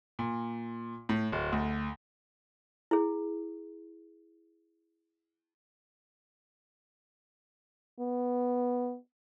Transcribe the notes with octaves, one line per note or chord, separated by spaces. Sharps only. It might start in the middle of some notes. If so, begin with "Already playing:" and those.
A#2
A2
D1
D2
E4 G#4
B3